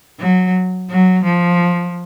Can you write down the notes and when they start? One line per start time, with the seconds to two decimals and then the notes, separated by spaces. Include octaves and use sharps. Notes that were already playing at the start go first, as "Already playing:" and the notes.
0.20 F#3
0.90 F#3
1.25 F3